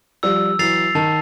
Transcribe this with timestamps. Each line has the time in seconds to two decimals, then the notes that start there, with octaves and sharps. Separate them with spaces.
0.23 F3 G3 E6
0.59 E3 F#3 A6 C7 F7
0.95 D#3 A5